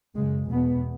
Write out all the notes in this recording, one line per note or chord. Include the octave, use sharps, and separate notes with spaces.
F#2 C#3 G#3
E2 B2 B3